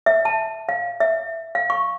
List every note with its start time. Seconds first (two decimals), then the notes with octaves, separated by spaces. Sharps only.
0.06 E5
0.25 A5
0.69 F5
1.00 E5
1.55 F5
1.70 C#6